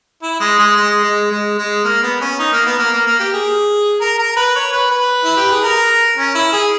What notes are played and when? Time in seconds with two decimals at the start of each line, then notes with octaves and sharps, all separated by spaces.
0.23 E4
0.40 G#3
0.59 G#3
0.77 G#3
1.04 G#3
1.31 G#3
1.58 G#3
1.85 A#3
2.03 B3
2.21 C#4
2.39 D#4
2.53 A#3
2.66 B3
2.79 A#3
2.93 A#3
3.07 A#3
3.20 G4
3.34 G#4
4.01 A#4
4.19 A#4
4.37 B4
4.56 C#5
4.73 B4
4.91 B4
5.24 E4
5.37 G4
5.51 G#4
5.63 A#4
6.18 C#4
6.35 E4
6.53 G#4